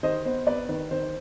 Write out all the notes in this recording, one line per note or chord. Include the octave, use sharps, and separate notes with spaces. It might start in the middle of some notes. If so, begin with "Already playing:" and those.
D#3 C5 D#5
B3 C5
B3 B4 D5
D#3 B4
D#3 C5